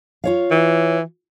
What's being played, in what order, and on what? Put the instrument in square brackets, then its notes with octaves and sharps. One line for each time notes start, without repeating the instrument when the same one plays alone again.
[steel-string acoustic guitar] F4 C#5 F5
[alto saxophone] E3